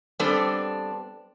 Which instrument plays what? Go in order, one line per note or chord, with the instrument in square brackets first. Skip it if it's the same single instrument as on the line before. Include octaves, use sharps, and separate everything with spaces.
[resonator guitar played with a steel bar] G3 B3 C4 D4 A4